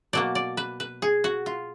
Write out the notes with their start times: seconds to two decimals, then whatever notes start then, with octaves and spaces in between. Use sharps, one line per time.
0.13 B2 F#3 A#3 D5
0.35 D5
0.57 B4
0.80 B4
1.02 G#4
1.24 F#4
1.46 F4